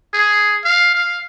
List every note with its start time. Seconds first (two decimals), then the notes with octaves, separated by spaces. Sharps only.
0.14 G#4
0.64 F5
0.94 F5